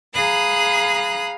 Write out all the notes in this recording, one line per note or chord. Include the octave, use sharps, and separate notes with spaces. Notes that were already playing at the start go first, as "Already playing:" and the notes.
G#4 F5 A#5 B5 D#6 F#6